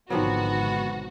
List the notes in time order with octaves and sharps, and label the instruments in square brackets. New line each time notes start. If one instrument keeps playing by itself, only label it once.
[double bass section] G#1 B2 D3 [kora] D#3 F3 F#3 [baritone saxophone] B3 [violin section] F#4